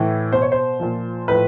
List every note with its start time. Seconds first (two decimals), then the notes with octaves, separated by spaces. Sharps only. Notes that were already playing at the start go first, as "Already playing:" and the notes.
Already playing: A2 E3
0.32 B2 C5
0.42 C#5
0.52 C5
0.80 A#2 F3
1.28 A2 F3 B4